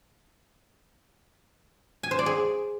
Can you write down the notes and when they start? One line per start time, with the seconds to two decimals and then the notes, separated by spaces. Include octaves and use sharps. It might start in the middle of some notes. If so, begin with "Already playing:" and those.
2.03 G#5
2.11 C5
2.19 D5
2.26 G#4